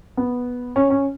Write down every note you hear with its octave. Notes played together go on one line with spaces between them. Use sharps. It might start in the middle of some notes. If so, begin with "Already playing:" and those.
B3
C#4
C#4